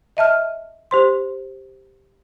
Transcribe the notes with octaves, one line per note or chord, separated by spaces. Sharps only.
D#5 E5 A5 F6
G4 C5 C6